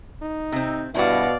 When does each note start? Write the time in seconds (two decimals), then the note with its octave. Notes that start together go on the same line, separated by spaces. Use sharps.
0.22 D#4
0.52 C3 C4
0.95 G2 B2 E4 F#4 D5 F5